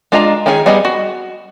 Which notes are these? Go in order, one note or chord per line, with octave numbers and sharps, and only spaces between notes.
G#3 D4 F4 D#5 A#5
D#3 C#4 D#4 G#4
G3 B3 G#4 D#5 B5
F#4